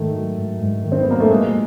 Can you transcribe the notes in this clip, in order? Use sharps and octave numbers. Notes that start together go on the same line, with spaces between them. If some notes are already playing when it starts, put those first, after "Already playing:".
Already playing: G#2 D#3 A3
F#3
G#2
G#2
D#3
C4
B3
F#3 A#3
A3
A#2 G#3